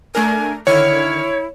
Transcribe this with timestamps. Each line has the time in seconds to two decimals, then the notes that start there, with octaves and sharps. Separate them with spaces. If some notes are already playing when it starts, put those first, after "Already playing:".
0.15 A3 D4 A#4 G#5
0.67 D3 D#3 E4 C#5 F6